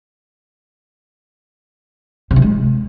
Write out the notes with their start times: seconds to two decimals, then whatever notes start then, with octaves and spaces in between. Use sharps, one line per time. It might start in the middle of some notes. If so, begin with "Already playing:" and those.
2.31 C3
2.36 E3
2.42 G#3